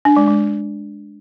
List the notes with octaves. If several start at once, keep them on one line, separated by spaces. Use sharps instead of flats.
D4
G#3
G#3